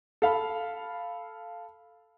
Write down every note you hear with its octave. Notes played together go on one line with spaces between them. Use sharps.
A4 F5 B5